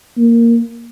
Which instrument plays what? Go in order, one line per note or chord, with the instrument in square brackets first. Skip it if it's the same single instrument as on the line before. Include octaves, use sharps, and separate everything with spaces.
[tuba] A#3